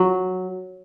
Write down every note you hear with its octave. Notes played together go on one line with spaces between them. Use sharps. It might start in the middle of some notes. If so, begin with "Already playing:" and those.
Already playing: F#3